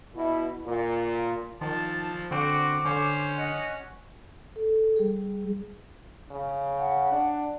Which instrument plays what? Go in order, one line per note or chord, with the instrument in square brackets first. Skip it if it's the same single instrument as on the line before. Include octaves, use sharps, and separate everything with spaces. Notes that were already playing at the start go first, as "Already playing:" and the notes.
[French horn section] B2 E4
A#2
[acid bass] D#3 [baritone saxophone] F3 [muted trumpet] A5
[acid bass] D3 [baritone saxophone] C4 [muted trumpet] F#4 [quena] D6
[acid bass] D3 [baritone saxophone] C#4 [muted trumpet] C5
[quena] D#5 [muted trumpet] F#5
[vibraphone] A4
G3 G#4
[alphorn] C#3
[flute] F#5
[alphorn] D4